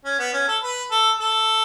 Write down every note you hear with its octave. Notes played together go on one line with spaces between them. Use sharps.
C#4
B3
C#4
A4
B4
A4
A4